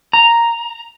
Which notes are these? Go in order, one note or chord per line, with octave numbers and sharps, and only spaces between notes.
A#5